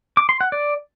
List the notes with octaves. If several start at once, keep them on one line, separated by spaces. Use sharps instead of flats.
D6
C6
F#5
D5